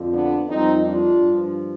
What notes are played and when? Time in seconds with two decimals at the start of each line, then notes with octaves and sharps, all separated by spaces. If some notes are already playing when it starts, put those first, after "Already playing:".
Already playing: F2 D3 F3
0.12 B3 D4
0.48 F2 D#3 G3 C4 D#4
0.84 D4 F4
1.20 G2 F3